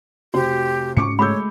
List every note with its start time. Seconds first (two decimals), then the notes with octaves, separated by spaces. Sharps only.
0.34 F1 F#4 G4 C5
0.97 G#2 C#4 C#6 D6 C#7
1.19 G#3 A3 C#5 B5 D6 E6 G6